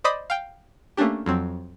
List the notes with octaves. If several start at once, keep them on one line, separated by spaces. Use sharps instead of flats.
C5 D5 D#5 B5 D6 D#6
F5 G5
A3 A#3 C#4 D4 G4
F2 F#3 C4